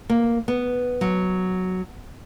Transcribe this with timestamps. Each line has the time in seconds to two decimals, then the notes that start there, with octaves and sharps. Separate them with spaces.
0.09 A#3
0.48 B3
1.01 F#3